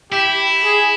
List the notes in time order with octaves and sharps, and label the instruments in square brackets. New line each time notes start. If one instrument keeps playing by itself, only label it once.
[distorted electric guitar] E4 [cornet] G4
[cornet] G#4